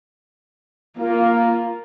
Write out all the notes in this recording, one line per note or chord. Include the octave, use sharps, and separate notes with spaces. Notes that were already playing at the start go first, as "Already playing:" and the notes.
A#3 F4